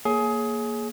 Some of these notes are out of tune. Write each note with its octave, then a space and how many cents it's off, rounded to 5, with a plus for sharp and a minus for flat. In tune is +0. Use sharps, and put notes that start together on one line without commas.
A#3 +0 G#4 +20 C#5 +0